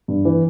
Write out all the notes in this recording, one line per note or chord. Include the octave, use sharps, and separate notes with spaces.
G2
E3